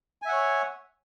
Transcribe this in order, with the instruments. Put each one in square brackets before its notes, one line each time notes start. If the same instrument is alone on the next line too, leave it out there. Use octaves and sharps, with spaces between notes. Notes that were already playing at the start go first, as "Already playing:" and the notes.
[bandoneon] G#5
E5
F#5
C#5